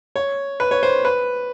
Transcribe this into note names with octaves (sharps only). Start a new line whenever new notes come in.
C#5
B4
C#5
C5
B4